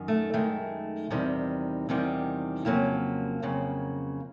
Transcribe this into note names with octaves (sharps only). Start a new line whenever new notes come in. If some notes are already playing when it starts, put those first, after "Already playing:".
Already playing: F#2 D#3
A3
F#2 D#3 G#3 A3
E2 C3 D#3 G3
E2 C3 D#3 G3
F2 C#3 F#3 A#3
F2 C#3 F#3